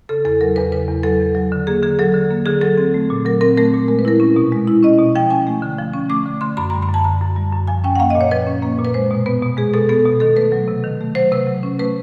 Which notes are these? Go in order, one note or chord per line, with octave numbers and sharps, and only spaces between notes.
C#3 A4
E2 A4
F#3 A#4
E2 B4
C#3 B4
E2
F#3 A4
E2
F#3
D3
A#3 G#4
D3 G#4
F#3 A4
D3
A#3
D3 G#4
F#3 A4
C4
A3
A#2
F#3 A#4
C4 A#4
A3 A#4
A#2
G#3 A#4
B4
E4 A#4
C#4
B2
G#3
E4
C#4 D#5
B2
F3 G5
C#4 G#5
A3
D3
F3
C#4
A3 D6
D3
D3 C6
F#2 B5
G3 A#5
B5
F#2 A5
D3 A#5
F#2
G3
F#2
F3 G#5
C#4 G5
F#5
A#3 F5
A#2 D#5
C#5
F3 B4
C#4
A#3
A#2
B4
G#3 C5
B2
B3 B4
B2
G#3 G#4
B2 A4
B3 A4
B2
D#3 A4
A3 B4
F#3
C3
D#3
A3
F#3 C5
C3 B4
F#3
C#4
A3 B4